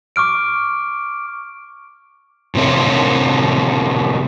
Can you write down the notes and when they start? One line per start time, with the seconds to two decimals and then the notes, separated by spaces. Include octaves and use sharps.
0.16 C#6 D6 F6 D7
2.55 A2 C3 C4 A#4 C#5